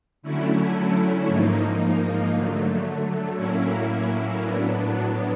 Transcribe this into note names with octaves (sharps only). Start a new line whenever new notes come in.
D3 F#3 A3 C#4 E4
G#2 F3 A#3 D#4
D3 F#3 A3
A2 F#3 A#3 C#4 E4
A2 F#3 B3 D4